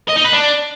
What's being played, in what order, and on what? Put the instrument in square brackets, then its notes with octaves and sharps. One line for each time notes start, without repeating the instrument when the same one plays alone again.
[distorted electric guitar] D#5
D#4
B4
D4